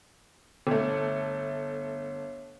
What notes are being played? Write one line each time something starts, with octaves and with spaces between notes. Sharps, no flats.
G1 A3